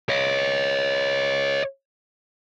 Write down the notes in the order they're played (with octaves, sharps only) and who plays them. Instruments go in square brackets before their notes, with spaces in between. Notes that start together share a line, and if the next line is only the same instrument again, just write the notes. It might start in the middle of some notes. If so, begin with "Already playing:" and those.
[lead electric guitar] C#5 D#5